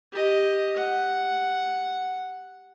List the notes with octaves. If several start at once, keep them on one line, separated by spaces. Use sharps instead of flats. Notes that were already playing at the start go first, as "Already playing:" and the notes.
G4 D#5
F#5